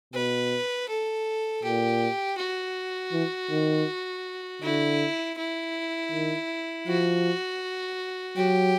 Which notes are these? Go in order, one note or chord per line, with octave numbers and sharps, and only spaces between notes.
B2 B4
A4
A#2 G4
F#4
E3
D#3
D3 E4
E4
D#3
F3 F#4
F#3 G4